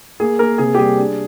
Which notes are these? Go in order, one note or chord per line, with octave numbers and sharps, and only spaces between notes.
A#3 G#4
A#3 A#4
C3 G#4
G4
G3 G#4
D4